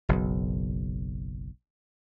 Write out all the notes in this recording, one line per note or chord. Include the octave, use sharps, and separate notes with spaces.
F#1 B1